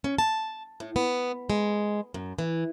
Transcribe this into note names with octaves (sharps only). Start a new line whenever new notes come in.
C#4
A5
A2
B3
G#3
F#2
E3